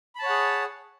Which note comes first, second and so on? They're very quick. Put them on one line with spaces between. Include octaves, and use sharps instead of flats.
B5 A5 C#5 F#5 G#4